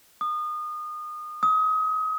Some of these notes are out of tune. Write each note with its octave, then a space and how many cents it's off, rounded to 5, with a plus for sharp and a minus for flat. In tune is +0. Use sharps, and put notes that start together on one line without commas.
D#6 -30
D#6 +30